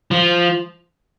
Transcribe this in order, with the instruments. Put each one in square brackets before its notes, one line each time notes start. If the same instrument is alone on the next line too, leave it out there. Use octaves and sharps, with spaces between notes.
[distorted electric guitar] F3